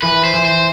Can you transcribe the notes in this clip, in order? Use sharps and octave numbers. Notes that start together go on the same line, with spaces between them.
E3 B4
C5
E3
C5